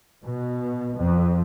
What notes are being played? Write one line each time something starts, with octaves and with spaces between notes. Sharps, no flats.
B2
F2